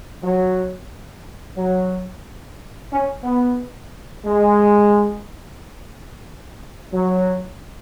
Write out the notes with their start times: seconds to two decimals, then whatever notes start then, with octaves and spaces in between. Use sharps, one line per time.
0.23 F#3
1.57 F#3
2.91 C#4
3.24 B3
4.25 G#3
6.92 F#3